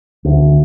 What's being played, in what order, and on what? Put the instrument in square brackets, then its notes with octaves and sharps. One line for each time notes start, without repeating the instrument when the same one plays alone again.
[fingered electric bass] D2